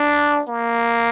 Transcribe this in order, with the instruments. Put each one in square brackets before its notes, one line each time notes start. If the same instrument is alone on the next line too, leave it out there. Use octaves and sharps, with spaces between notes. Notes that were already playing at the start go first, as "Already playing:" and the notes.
Already playing: [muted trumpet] D4
A#3